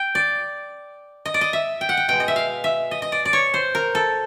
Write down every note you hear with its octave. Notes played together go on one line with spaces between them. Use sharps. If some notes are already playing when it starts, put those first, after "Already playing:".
Already playing: G5
D5
D#5
D5
D#5
E5
G5
F#5
G5
B2 G#3 G5
D#5
E5
F5
E5
D#5
D#5
D5
D5
C#5
C5
A#4
A4